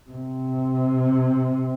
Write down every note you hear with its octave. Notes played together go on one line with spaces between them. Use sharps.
C3